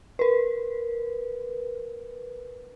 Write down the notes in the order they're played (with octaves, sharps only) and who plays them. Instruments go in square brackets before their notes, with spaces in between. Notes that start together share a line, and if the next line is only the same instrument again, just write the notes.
[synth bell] A#4 B4